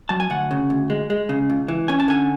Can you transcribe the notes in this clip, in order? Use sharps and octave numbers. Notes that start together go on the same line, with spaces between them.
F#3 A5
G#5
D2 F#5
C#3
D2
G#3
G#3
C#3
C#2
E3
C#4 G#5
A5
D3 G#5